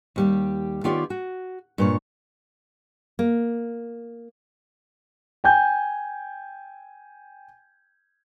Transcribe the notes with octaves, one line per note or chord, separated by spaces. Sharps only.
D#2 G3 G4
D#3 B3 F4 G4 C#5 D5
F#4
G2 A#2 C#5
A#3
G5 G#5 G6